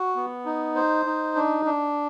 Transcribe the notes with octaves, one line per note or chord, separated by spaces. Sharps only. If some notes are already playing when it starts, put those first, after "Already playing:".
Already playing: F#4
B3
D#4
C5
D#4
D4
D4